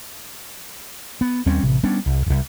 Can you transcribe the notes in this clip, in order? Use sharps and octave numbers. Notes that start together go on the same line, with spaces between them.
B3
D#2 G3 C4 C#4
A1 C3
G3 B3 C#4 D4
C2
D#1 C2